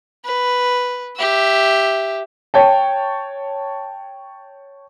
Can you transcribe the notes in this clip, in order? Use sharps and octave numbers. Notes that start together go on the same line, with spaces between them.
B4
G4 E5
C#5 G5 A5